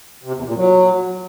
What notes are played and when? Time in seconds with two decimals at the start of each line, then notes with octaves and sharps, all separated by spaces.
0.24 C3
0.35 E2
0.45 A#2
0.56 F#3